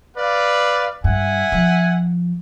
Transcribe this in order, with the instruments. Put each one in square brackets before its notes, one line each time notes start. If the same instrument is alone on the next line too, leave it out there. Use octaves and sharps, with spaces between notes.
[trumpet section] B4 D5 F5
[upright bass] G2 [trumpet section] E5 F#5 G#5
[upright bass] F3